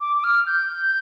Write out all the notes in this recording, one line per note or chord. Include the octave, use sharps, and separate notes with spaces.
D6
D6
F6
G6